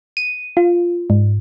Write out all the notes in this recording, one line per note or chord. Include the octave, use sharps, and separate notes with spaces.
D#7
F4
G#2